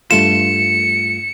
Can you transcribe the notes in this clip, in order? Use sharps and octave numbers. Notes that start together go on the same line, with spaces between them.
G2 A3 F4 C#7 E7